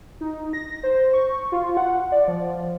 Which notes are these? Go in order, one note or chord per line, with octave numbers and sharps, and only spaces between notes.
D#4
A#6
C5
C#6
F4
F#5
D5
F3